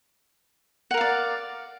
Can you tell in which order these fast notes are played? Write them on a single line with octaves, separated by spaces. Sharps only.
F#5 A#4 F5 D5